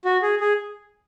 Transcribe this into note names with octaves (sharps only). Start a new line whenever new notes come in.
F#4
G#4
G#4